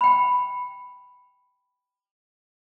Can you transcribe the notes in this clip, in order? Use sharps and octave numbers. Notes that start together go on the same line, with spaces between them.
G5 B5